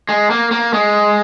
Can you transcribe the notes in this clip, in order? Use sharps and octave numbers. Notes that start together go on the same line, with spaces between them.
G#3
A#3
A#3
G#3